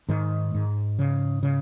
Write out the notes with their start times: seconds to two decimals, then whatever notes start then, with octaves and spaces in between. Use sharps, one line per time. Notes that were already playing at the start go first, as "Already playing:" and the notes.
0.09 G#2 D#3
0.54 G#2
0.99 C#3
1.43 C#3